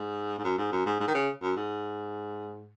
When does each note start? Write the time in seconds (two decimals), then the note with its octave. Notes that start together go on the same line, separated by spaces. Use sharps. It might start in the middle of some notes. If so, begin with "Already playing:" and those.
Already playing: G#2
0.38 G#2
0.44 F#2
0.58 G#2
0.72 F#2
0.86 G#2
1.00 G#2
1.08 D#3
1.14 C#3
1.42 F#2
1.57 G#2